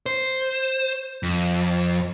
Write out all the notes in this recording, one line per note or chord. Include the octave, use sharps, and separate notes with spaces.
C5
F2